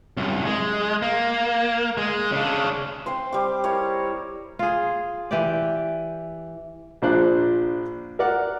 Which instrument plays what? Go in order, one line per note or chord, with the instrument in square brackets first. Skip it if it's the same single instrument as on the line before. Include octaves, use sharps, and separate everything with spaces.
[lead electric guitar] C2 F#2
G#3
A#3
G#3
C#3 D4
[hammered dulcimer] C4 C5 C6
G3 D6
C4 E4 A#4 C#5
[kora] F4 G#4
E3 G4 D5
[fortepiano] A#1 A#2 D4 C5 D5 F#6
A#4 D5 F#5